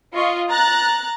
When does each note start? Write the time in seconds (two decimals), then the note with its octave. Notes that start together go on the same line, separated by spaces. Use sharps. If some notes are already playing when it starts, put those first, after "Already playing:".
0.13 F4 D#5 C#6
0.49 A#5 F#6 A6